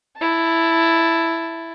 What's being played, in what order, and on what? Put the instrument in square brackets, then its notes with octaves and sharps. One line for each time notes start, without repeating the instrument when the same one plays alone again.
[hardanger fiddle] E4 A5